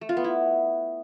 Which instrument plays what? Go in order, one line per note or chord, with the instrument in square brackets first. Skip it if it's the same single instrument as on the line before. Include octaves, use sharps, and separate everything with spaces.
[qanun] A3
F4
B3
E4